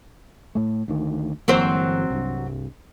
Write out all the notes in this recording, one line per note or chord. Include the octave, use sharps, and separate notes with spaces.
A2 A3
D2 D#3
G1 E3 F#3 A#3 C4 C5
C2 G2